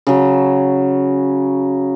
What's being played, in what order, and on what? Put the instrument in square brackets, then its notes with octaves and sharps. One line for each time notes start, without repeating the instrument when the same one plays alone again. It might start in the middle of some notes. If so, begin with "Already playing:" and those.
[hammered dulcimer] C#3 F#3